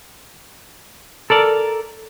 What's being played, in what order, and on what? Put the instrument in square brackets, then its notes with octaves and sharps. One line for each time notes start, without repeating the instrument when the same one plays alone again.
[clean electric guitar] A4 A#4 D5